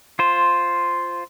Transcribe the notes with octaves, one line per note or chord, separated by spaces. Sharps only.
F4 C5